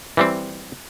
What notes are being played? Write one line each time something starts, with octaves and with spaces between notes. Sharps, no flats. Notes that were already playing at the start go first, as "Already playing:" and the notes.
E3 G3 C4